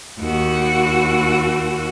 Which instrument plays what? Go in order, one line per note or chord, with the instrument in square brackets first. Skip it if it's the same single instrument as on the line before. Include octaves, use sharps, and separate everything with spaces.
[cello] D#2 F#4